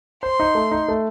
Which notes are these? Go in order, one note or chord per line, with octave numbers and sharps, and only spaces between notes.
C5 C6
D#4
A3
D#4
A3